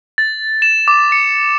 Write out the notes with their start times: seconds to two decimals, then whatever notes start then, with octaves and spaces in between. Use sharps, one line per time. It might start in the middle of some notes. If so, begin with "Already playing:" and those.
0.18 A6
0.62 E7
0.88 D6
1.12 C#7